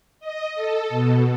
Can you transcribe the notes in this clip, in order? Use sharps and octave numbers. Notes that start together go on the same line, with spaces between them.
D#5
A4
B2